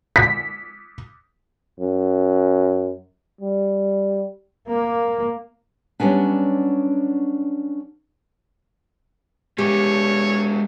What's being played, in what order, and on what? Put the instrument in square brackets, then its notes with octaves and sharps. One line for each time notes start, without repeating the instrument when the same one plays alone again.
[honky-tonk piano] B6
[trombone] F#2
G3
[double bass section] A#3
[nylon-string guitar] F#3 G3 B3 C#4 D4
[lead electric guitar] G#3 B3 [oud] G4 [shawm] C#5